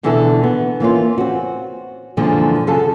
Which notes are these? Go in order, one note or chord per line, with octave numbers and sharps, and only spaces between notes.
B2 D3 E3 B3 E4 A4
B3
E3 A#3 C#4 F4
C4 C#4 F#4
F#2 A#2 D3 E3 F3 G#3
F#2 C#3 F4 A4 A5